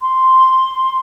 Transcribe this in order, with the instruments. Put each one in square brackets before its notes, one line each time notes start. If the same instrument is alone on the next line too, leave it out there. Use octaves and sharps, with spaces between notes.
[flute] C6